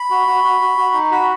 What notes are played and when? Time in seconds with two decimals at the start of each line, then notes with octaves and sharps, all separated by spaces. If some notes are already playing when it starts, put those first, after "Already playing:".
Already playing: B5
0.10 F#4
0.27 F#4
0.44 F#4
0.61 F#4
0.78 F#4
0.94 D#4
1.11 F#4 B5